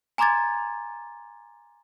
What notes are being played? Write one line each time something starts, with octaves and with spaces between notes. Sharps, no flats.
G#5 A#5 C6 D6 G#6 A6